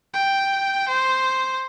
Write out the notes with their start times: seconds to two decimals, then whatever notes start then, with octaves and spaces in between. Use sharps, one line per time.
0.13 G5
0.88 C5